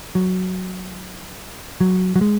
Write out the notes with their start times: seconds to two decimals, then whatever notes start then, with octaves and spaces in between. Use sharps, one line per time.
0.15 F#3
1.81 F#3
2.16 F#3
2.21 G#3